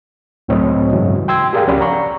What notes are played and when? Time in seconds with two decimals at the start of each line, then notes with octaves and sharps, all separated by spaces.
0.48 C#2 A2 F#3 C4 C#5 D#5
0.92 G2 C#3 E3 F#3 G#3
1.28 G5 C6 E6 G#6
1.53 G4 G#4 A#4 D5 F5 G5
1.67 C#2 F3 C#4 D5 F#5 B5
1.81 A#5 C#6